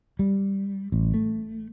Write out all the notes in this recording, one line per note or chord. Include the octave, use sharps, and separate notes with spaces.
G3
A1
A3